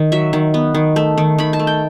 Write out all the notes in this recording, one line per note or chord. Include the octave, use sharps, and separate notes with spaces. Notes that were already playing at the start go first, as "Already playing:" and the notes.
Already playing: D#3
F#3 E5
D#3
B3
D#3
A3
D#3
D#3 B5
A5
A3
G5